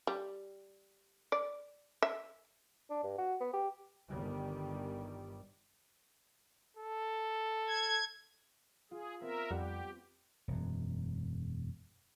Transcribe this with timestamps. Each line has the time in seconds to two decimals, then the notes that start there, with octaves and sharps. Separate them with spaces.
0.07 G3
1.32 D5
2.02 E5
2.90 D4
3.04 G2
3.18 F#4
3.40 B3
3.53 G4
4.10 G1 D#3 G3
6.77 A4
7.68 G#6
8.91 F4 G#4
9.21 B3 C4 A#4 E5
9.51 F2 G3 G4 F#5
10.48 E1 F#2